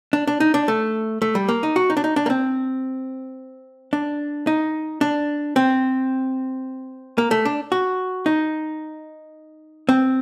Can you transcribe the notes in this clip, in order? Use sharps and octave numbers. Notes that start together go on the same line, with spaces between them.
D4
D4
D#4
D4
A3
A3
G3
A#3
D#4
F#4
D#4
D4
D#4
D4
A#3
C4
D4
D#4
D4
C4
A#3
A3
D4
F#4
D#4
C4